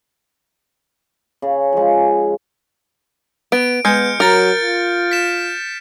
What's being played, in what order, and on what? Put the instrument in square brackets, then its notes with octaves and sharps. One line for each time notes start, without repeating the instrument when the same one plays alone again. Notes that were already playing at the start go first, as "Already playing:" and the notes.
[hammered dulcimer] C#3
F3 G#3
[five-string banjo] B3 [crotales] D7
[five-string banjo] G#3 [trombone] B3 [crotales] F6 G6 C#7
[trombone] F#3 [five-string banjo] A#4 [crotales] F6 A6 D7
[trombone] F4
[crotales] B6 E7